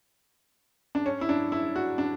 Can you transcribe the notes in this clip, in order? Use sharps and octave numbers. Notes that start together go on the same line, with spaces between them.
D4
C#4
E4
D4
E4
F#4
D4